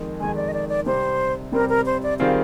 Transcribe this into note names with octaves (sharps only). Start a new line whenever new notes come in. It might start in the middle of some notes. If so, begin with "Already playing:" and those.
Already playing: F2 D#3 G#3
F2 D#3 G#3 G#5
D5
D#5
D5
D5
C3 G3 C4 C5
C3 G3 C4 A#4
A#4
C5
D5
D#3 G3 C4 F4 G#4 F5